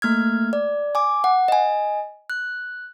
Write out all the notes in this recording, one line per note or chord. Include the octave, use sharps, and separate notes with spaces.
A3 A#3 F6 G#6
D5
G#5 D6
F#5
D#5 G#5
F#6